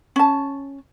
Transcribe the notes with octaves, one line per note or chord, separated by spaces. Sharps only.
C#4 A5